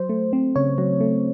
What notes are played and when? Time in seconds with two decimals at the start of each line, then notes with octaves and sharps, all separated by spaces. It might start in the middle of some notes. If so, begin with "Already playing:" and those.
Already playing: F#3 C5
0.09 A3
0.33 C4
0.56 C#3 C#5
0.78 F#3
1.01 A3